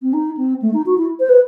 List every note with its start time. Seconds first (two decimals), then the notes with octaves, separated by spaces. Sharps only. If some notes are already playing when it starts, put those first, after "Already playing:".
0.02 C4
0.13 D#4
0.37 C4
0.62 A3
0.73 D#4
0.86 F#4
0.97 E4
1.19 C5
1.29 B4